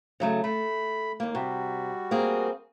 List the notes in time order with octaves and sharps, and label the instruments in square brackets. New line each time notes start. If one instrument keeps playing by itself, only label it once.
[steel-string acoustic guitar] C#3 F#3 A3
[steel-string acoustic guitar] A3 [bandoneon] B5
[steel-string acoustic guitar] D#2 A#3
[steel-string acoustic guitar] C3 [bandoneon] G3 F#4
[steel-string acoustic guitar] A#3 C4 G#4